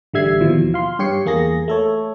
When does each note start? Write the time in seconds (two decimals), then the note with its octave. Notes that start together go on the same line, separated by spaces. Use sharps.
0.14 A1 D3 G3 E5 G#6 C7
0.41 D#2 B2 E3 F3
0.74 F5 C6
0.99 G2 G4 C#5 C7 C#7
1.26 E2 A#3 G#4 A#6
1.68 A3 A4 C#5